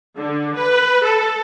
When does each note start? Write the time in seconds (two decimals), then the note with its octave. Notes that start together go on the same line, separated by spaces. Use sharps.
0.18 D3
0.56 B4
1.03 A4